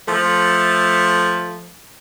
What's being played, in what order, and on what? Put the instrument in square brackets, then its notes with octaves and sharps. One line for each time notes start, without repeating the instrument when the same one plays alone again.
[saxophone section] F3 A3